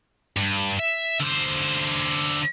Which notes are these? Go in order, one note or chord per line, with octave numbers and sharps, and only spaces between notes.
G2
E5
D3 C5